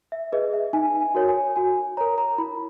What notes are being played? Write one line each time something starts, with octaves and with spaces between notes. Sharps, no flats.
E5
G#4 B4 D#5
E5
D#4 G#5
G#5
F#4 A#4 C#5
G#5
F#4 G#5
A#4 C#5 A#5
A#5
E4 B5